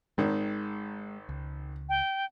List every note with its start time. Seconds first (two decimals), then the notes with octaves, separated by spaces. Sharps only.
0.18 G#1 D#3 G#3
1.29 C#2
1.89 G5